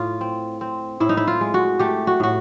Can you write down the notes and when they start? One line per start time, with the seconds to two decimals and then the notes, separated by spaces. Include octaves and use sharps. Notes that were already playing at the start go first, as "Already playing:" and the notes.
Already playing: A2 F4
0.21 C4
0.61 C4
1.00 A2 E4
1.09 D#4
1.17 E4
1.27 F4
1.41 G#3
1.54 F#4
1.79 A3 G4
2.07 F#4
2.20 A2 F#4